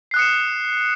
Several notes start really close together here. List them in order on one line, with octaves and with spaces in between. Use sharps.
C7 F#6 D#6 C#7 E7